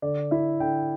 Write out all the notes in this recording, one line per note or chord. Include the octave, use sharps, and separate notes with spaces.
D3 D5
E4 E5
D3 G5